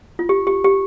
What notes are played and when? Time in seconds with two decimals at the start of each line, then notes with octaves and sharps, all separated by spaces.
0.19 F4
0.29 G4
0.47 G4
0.64 G4